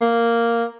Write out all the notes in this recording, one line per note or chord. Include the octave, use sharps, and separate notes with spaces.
A#3